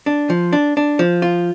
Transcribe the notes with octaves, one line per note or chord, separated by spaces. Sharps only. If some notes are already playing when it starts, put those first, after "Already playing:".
D4
F3
D4
D4
F3
F4